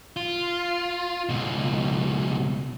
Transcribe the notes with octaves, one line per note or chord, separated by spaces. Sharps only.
F4
C#2 B2